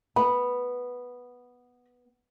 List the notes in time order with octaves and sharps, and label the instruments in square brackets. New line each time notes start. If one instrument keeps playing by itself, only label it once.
[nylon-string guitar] B3 [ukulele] B5